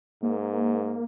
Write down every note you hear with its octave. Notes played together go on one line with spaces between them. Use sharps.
G#2 A#3